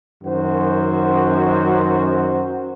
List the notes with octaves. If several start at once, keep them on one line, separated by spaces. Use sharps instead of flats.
F#2 D#3 F#4 C5